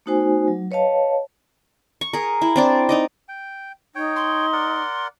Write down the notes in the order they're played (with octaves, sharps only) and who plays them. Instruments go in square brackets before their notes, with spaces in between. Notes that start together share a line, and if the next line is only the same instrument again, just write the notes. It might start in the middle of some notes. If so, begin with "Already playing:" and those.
[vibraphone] A3 B3 D#4 F#4 C5 G#5
F#3
B4 C#5 D#5 F5 A5
[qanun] C#6
G#4 A#4
E4
C4 D4 D5
D#4 D5 D#5
[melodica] G5
[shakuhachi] D#4 [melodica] C#5 G5
[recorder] C6
[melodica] A#4 D5 F#5